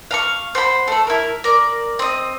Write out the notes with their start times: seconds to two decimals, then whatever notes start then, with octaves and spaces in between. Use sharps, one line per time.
0.11 F5 A#5 C#6
0.55 C5 F#5 B5
0.88 A3 A4
1.07 E4 A#4
1.44 A#4 D5
1.99 C4 D#5